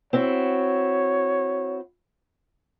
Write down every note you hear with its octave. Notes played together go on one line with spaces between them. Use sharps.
C4 E4 F#4 C#5